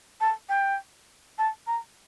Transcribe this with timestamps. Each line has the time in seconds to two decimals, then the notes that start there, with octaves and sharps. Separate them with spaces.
0.20 A5
0.48 G5
1.38 A5
1.66 A#5